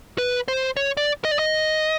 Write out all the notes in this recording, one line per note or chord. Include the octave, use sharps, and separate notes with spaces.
B4
C5
C#5
D5
D#5
D5
D#5